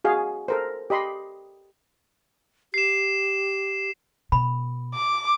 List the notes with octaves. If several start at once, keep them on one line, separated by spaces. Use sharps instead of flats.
F#4 G#4 F5
A4 A#4 C5
G4 D#5 B5 C6
G4 C7 E7
B2 B5
D6